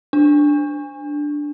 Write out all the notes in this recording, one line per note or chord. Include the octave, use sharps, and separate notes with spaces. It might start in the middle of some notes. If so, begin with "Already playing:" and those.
D4